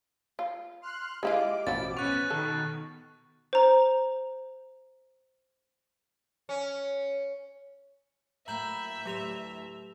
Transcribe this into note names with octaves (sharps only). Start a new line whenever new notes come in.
F4
C6 F6 F#6
G#3 E4 F4 G4 D#5 F5 D6
A1 B2 F3 E4 F#4 A6
B3 C#4 C#6 F#6 F7
B2 D#3 A4
C5 A#5
C#4
A2 F#3 A#3 E5 A#5 B5 G6 F#7
D2 A2 F#3 G4 C#5 F7